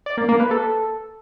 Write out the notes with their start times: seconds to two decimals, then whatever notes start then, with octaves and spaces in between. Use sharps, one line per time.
0.06 D5
0.17 A#3
0.29 A#3
0.40 B4
0.51 A4